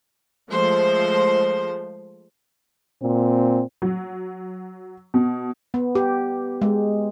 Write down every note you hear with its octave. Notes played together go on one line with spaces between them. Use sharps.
F3 G#3 A3 C5
A#2 C4
F#3
B2
B3
G4
G#3